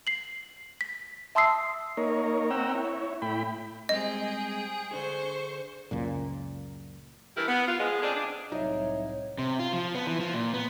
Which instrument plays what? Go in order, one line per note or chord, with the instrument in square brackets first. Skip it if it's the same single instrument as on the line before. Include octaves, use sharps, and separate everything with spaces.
[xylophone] C7 F#7
B6
E5 A5 C6 D#6 E6 C7
[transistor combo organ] A#3 D#4 A#4 C#5
C4 F#5 G5 A#5 E6
E4 C#5
A2 E4 G5 B5
[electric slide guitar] G3 G#3 C4 [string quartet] G#4 G5 [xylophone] D#5
[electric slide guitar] D3 D4 G#4 [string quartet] C5 C#6
[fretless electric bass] C#2 F#2 A#2
[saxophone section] G2 E3 E4 G4 A#4
B3
F4
F3 G#3
C#3 C4 D4 G#4
D4
[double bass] C2 A2 [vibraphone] F#3 E5 [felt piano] D#4 [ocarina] C#5
[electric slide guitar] C3
F4
F3
B3
E3
F3
A#2
B3